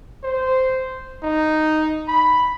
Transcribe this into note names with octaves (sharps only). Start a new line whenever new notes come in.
C5
D#4
B5